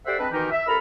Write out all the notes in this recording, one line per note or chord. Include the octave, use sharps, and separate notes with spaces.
G4 A4 C5 D5 E5 F#5
G#3 C4 D4 B4
B2 D#3 E3 D#4 G4 A#4
E5
C2 A4 A#4 A#5 B5